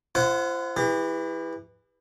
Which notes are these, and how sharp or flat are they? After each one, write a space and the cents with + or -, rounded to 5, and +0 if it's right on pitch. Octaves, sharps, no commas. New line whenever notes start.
F4 -45 C5 +0 F#5 +0
E3 +0 G4 +45